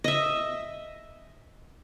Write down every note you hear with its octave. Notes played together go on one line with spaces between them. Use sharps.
D#5 E5